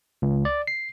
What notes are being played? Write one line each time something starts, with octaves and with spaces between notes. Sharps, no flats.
C#2
D5
C7